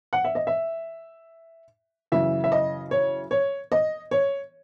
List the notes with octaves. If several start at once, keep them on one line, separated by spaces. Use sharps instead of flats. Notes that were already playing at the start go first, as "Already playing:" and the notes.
F#5
E5
D#5
E5
F#2 C#3 E3 E5
E5
D#5
C#5
C#5
D#5
C#5